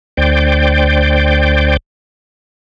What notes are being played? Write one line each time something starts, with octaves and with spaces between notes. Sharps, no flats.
D2 C5 D5 G5